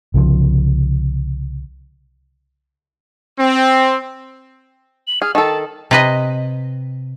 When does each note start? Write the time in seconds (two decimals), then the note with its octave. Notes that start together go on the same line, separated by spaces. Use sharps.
0.14 C2 C#3 E3 F3
3.40 C4
5.07 F#7
5.22 G#4 F6
5.35 D#3 A4 A5
5.91 C3 B4 D#5